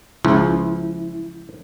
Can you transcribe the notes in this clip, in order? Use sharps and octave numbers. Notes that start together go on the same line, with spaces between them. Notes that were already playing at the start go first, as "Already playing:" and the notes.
C#2 F3 E4